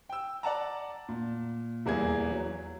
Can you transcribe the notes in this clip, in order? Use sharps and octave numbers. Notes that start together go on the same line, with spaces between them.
G5 E6
D5 F#5 A5 A#5
A#2
D#1 E2 A#3 G#4 E5 G#6
F#3